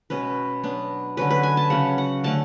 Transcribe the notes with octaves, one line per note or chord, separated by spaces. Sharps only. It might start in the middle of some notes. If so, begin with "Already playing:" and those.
B2 G#3 C#4 B4
F#3 B3 D4
D3 F#3 C#4 B4
B4
G#5
A5
C#3 F#3 C#4 F#5
F#5
D3 A3 C#4 A5